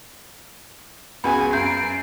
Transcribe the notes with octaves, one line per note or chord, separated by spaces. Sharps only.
C#2 B3 F#4 G#4 G#5 B5
F#2 G6 C7 D7